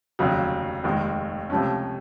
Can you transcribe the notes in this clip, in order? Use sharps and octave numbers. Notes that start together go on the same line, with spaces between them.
F1 D#2 C#3 F#3
F1 D#2 D#3 G#3
C#2 C3 F3 A3 C#4